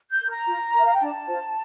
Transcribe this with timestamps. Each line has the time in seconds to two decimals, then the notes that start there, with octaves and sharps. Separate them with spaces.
0.11 G6
0.21 A#4
0.29 A#5
0.47 F4
0.74 A#4 E5
0.85 F5
0.93 G5
1.00 D4 A5
1.27 F4 C5